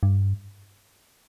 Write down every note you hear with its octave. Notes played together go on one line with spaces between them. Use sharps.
G2